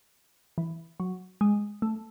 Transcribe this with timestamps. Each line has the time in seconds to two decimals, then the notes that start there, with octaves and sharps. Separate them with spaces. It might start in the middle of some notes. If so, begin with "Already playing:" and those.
0.58 E3
1.00 F#3
1.41 G#3
1.82 A3